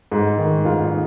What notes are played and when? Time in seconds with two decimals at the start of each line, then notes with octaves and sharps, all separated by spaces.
0.12 G#2
0.38 D#3
0.65 G#2 F4
0.84 D#4